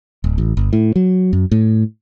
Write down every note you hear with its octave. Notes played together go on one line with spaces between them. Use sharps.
D1
A1
G1
A2
F#3
F#2
A2